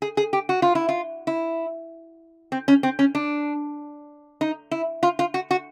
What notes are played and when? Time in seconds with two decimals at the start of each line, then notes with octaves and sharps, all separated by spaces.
0.02 G#4
0.17 G#4
0.33 G4
0.49 F#4
0.62 F4
0.75 E4
0.89 F4
1.27 E4
2.52 C4
2.68 C#4
2.83 C4
2.99 C#4
3.15 D4
4.41 D#4
4.71 E4
5.03 F4
5.19 F4
5.34 F#4
5.51 F#4